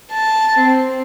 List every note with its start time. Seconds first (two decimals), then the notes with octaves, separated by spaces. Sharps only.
0.11 A5
0.58 C4